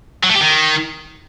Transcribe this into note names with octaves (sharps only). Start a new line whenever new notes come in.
F#3
A3
G4
D#3